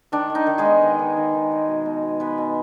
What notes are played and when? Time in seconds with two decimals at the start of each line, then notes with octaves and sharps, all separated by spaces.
0.12 D#3 D4
0.30 D#3
0.35 D#4
0.47 D#3
0.58 G#3 G#4
0.65 B3
0.82 D#3
0.99 D#3
1.17 D#3
1.34 D#3
1.52 G#3
1.68 B2
1.86 B2
2.03 B2
2.20 G#3 B3 B4
2.38 B2